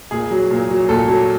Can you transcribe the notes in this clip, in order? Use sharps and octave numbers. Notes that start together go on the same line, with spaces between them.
A#2 G#4
F#3
A#2
F#3
A#2 A4
F#3